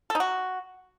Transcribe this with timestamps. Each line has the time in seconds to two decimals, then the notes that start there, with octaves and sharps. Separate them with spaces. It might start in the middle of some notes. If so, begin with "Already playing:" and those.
0.10 A4
0.15 D#4
0.20 F#4